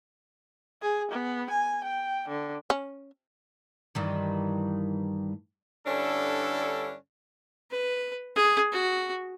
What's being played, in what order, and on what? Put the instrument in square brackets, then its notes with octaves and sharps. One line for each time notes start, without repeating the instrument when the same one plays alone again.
[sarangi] G#4
B3
G#5
G5
D3
[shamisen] C#4
[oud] G2 D#3 E3
[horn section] G2 D3 C#4 D4 E4 A4
[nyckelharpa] B4
G#4
F#4